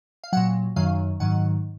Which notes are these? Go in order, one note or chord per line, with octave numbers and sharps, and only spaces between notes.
F5
A#2 F#3 F#5
F#2 D#3 F#3 F5
G#2 D#3 F#3 F#5